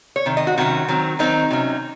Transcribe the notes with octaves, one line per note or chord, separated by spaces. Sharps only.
C#5
C3 D#3
D#5
F#4
C3 D#3 F#3 C#4 F#4
D#3 F#3 C4
D#3 F#3 C4 D#4
C3 F#3 C#4